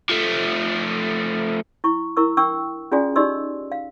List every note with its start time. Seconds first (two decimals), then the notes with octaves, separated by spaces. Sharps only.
0.10 F3 A3
1.84 E4 C#6
2.17 E4 A#4 C#6 E6
2.37 D4 G5 C#6 E6
2.92 C#4 F4 F#4 G#4 D5 G#5
3.16 D#4 G4 D5 D#5 C6 E6
3.72 F5